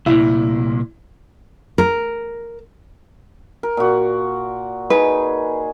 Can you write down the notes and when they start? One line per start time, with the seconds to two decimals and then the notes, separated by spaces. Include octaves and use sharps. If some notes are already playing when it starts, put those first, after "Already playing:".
0.06 C2 A#2 E4
1.78 A#4
3.63 A#4
3.77 A#2 F#4
4.90 D#4 G#4 B4